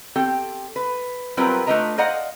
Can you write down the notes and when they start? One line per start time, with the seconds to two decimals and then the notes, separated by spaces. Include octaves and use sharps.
0.16 C4 G4 A4 G5
0.76 B4
1.37 F#3 G3 C4 F4 A#4 B4
1.67 A3 D4 F4 B4 D#5 A#5
1.98 C5 D5 D#5 F5 F#5 A#5